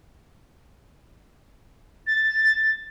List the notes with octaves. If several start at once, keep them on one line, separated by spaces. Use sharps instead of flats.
A6